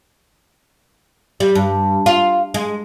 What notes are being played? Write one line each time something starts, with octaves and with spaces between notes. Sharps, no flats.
G3
G2
F4
G#3